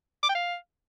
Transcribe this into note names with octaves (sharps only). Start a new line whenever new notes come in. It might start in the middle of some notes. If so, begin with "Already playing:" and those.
D6
G5
F5